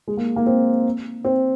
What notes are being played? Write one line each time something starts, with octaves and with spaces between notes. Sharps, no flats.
G#3
A#3
A#3
C4
C4